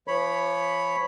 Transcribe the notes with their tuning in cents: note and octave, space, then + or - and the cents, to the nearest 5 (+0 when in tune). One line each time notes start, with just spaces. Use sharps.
F3 -40 C#5 +0 B5 +0